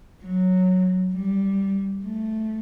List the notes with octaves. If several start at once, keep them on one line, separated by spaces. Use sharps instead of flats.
F#3
G3
A3